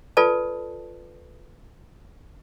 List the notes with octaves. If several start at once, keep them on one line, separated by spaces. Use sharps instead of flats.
F4 A4 B4 D5 A5